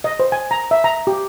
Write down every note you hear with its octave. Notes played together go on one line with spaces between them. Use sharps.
D#5
C5
G#5
A#5
E5
A#5
G4